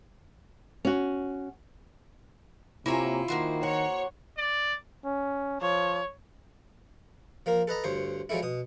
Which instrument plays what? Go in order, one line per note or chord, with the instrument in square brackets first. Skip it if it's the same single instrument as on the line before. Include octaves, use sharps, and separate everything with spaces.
[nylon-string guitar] C#4 F#4
[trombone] C3 [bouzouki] A#3 C#5 G#5 [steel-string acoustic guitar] E4 F4
[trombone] D#3 [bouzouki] A#3 F#4 C5
[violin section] C#5 [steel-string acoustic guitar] F#5
[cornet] D5
[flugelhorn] C#4
[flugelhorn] F3 [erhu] C#5
[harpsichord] F3 A#3 A#4
A4 B4 D#5 A#5
D2 G2 C5 C#5
F3 F#3 G#3 A3 E4
B2 D#6